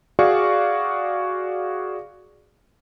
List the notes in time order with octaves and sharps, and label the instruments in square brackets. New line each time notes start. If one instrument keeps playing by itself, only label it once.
[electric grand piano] F#4 G#4 D5 F5 C#6